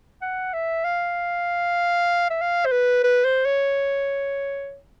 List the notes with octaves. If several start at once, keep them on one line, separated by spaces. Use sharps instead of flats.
F#5
E5
F5
E5
F5
C5
B4
B4
C5
C#5